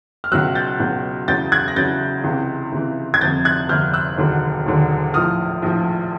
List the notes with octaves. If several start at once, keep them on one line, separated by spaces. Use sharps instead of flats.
F6
C#2 B2 F#3 E6 F#6
G6 A6
C#2 B2 F#3
E2 C#3 F#3 G6 A6
F#6 G#6
A#6
E2 C#3 F#3 G6 A6
C#2 C3 E3
C#2 C3 E3
G#6
G1 F2 C3 G6 A6
F#6 G#6
G1 F2 C3 F6 G6
E6 F#6
E1 D#2 D3 F#3
E1 D#2 D3 F#3
A#1 A2 F3 D#6 F6
A#1 A2 F3